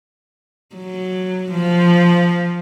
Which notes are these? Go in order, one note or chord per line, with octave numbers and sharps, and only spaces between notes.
F#3
F3